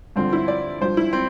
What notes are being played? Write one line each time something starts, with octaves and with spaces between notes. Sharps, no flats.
G2 D3 F3 C4
E4
D5
G2 F3 C5
E4
C4